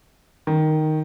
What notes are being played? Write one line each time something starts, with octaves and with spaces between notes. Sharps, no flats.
D#3